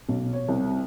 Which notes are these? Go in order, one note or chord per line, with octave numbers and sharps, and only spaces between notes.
B1
C#5
C2